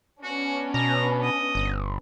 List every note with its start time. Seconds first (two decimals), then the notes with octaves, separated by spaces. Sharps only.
0.23 B3 C#4 D4 F#4
0.74 B2 A#5
1.22 D#5
1.55 G1